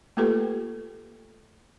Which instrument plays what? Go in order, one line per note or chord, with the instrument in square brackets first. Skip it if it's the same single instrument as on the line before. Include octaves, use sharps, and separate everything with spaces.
[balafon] A3 A#3 F4 G4 A4 B4